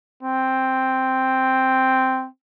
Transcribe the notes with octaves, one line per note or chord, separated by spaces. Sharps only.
C4